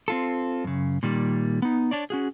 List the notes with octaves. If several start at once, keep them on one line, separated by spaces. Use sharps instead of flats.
C4 F4 A4
F#2 C#3
A#2 D#3 G3
B3 D#4
D4 C#5 D5
C#4 F#4 G#4